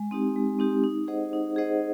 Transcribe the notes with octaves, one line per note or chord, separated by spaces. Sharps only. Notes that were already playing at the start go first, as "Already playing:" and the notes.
Already playing: G#3
C4 D#4 G4
G#3
C4 D#4 G4
D#4
G#4 C5 D#5 F#5
D#4
G#4 C5 D#5 F#5